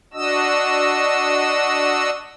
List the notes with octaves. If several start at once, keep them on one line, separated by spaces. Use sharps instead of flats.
D4 F#4 D#5 E6